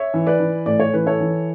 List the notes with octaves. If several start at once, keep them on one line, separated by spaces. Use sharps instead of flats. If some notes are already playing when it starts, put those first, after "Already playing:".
Already playing: C#5 E5
E3
B4 D5
E3
A2 D5
C#5
E3 B4
A4 C#5
E3